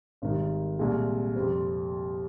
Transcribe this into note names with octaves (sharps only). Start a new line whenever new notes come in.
G#1 G#2 D#3 G3
C2 A#2 G#3
F2 C3 G3 C4